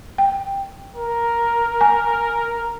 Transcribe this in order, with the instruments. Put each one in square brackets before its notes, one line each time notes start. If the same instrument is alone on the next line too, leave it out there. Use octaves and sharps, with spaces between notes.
[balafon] G5
[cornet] A#4
[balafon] G#5